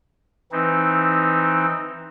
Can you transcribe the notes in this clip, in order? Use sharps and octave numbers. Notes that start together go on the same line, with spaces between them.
E3 C4 D#4